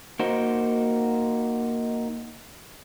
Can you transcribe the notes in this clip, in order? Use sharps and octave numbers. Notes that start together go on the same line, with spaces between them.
A#3 D#4 F#4 C5